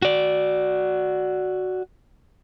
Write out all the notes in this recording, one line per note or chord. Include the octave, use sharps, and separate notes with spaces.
F#4 D5